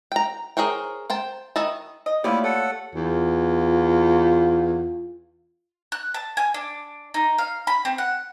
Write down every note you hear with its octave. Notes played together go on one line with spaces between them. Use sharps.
G5 A#5
G#4 A#4 C5 C#5 G5
C5 G5 A5
D#3 E4 D#5 A5
D#5
A3 A#3 E4 F4 G4 C#5 D5 F5
A4 C#5 F#5
E2 F4
F#6
A5
G#5
D4
D#4
F5
B5
C4
F#5